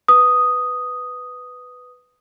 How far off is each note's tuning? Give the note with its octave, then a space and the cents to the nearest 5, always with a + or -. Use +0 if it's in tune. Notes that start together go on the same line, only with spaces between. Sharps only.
B4 +10 D#6 +0